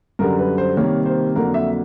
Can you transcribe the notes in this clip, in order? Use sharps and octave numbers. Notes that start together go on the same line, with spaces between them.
F#2 D3 G3 A#4
B4
C5
C3 D#3 G3 A#3 C#5
C5
F2 D3 F#3 A#3 A#4
E5